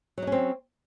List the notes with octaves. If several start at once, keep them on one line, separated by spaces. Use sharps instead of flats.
F#3 C4 C#4 D#4